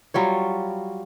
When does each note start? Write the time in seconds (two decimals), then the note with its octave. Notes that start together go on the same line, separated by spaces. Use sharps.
0.14 F#3 G3 F4 C#5